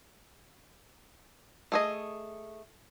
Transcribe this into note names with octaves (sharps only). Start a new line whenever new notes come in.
A3 G#4 D#5